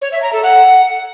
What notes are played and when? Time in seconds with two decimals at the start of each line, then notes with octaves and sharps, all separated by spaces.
0.02 C#5
0.12 E5
0.22 A#5
0.33 A4
0.43 F#5